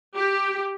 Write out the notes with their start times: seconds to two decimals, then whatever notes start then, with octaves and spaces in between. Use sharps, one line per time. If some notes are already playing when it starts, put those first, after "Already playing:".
0.15 G4